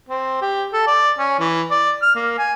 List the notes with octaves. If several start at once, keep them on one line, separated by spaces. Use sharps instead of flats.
C4
G4
A4
D5
C#4
E3
D5
F6
A#3
G#5